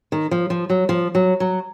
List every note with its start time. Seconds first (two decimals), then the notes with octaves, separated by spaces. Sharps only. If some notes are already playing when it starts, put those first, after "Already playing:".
0.12 D#3
0.31 F3
0.50 F3
0.70 F#3
0.89 F3
1.15 F#3
1.40 F#3